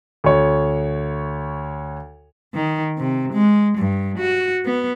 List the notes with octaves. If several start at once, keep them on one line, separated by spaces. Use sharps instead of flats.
D2 C#5
D#3
C3
G#3
G2
F#4
B3